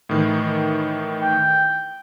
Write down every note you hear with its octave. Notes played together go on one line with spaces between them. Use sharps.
A2 D#3 E3
G5